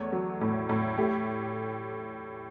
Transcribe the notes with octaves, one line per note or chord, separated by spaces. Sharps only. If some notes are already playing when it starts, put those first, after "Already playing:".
Already playing: E2 A3 A4 C#5
F#3
A2
A2
A3 G4